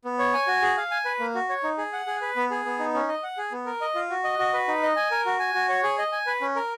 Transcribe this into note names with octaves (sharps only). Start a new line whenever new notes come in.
B3
C#5
G#5
F#4
G#4
F5
G#5
B4
A#3
F#4
C#5
D#4
G#4
F#5
G#4
B4
B3
G#4
B3
D#4
C#4
D#5
F#5
G#4
B3
A#4
D#5
F4
F#4
D#5
F#4
B4
D#4
D#5
G#5
A#4
F#4
G#5
F#4
C#5
G#4
D#5
G#5
B4
C#4
A#4